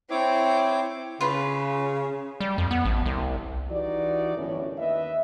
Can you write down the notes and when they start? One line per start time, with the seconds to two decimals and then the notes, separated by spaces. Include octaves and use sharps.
0.11 C4 E4 C#5 D6
1.21 C#3 F4 B4
2.40 G3
2.58 F2
2.71 B3
2.85 A1
3.06 C2
3.70 E3 D#4 F#4 G4 D5
4.36 G1 F#2 A2 C#4
4.77 D#2 B4 D#5 E5